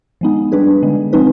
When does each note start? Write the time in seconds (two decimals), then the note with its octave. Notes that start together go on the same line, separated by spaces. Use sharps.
0.21 F3 G#3 B3 D#4
0.52 G3 D4 G#4 B4
0.82 D3 G#3 B3
1.13 F3 G#3 C4 D#4 B4